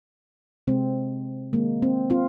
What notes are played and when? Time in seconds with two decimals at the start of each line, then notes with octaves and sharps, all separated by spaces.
0.67 C3 G#3 C4
1.53 D#3 G#3 A#3
1.82 C4
2.10 C4 F4